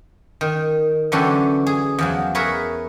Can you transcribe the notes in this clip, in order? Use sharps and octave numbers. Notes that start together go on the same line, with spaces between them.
D#3
D3 E3 F#3 C#4 G4 A4
G#4
E2 F3 F#3
G#4 A#4 B4 C#5 E5